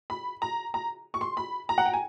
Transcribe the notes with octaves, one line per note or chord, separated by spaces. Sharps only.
B5
A#5
A#5
C#6
C6
B5
A#5
F#5
G5
G#5